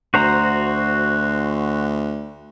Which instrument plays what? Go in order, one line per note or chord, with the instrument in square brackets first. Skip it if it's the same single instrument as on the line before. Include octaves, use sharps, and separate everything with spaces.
[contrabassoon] D2 [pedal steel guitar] F#4 C5 A#5